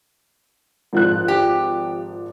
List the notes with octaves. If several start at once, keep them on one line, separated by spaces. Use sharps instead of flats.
G#1 F3 F#6
G4